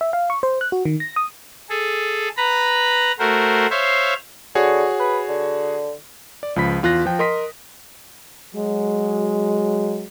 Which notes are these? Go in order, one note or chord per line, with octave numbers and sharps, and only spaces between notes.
E5
F5
C#6
C5
F#6
F#4
D#3
A#6
D#6
G#4 A4
B4 A#5 B5
A3 F#4 A#4 C5
C5 C#5 E5 F5
D3 F#4 G#4 C#5
B4
D3
D5
C#2 F3 B5 B6
E2 F4 F#6 A#6
F3 G5
A#4 D#5 C6 D#6 B6
F#3 G#3